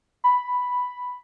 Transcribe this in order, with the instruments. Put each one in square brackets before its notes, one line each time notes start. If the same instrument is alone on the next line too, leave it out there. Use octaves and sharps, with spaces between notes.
[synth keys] B5